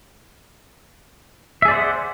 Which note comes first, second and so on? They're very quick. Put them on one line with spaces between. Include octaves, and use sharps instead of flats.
E5 G#4 D5 C5 F#5